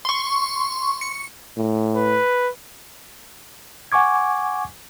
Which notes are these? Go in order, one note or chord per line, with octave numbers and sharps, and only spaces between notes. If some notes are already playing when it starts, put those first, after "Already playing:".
C6 C#6
C#7
A2
B4
F#5 G#5 C#6 D6 G#6